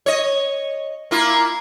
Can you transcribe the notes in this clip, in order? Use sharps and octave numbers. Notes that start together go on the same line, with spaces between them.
C#5 D#5
A#3 E4 F4